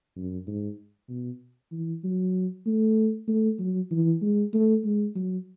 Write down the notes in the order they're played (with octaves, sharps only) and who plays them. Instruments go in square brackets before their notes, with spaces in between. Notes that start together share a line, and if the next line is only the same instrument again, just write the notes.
[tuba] F#2
G#2
B2
E3
F#3
A3
A3
F#3
E3
G#3
A3
G#3
F#3